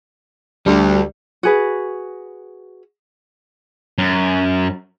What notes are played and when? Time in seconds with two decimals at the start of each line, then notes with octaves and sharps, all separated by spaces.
0.66 D2 G3
1.43 F#4 G#4 B4
3.98 F#2